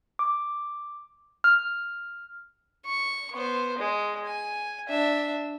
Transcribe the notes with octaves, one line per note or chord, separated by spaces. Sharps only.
D6
F6
C#6
B3 C5
G#3
G#5
D4 E5